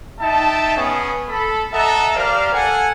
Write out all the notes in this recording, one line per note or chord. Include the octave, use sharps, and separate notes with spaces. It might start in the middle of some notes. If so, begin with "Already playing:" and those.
D#4 E5 G5 A5
B3 C#4 G#4
A4 B5
A4 D#5 E5 F#5 A5 A#5
G4 A#4 C5 D5 F5
A4 F#5 G#5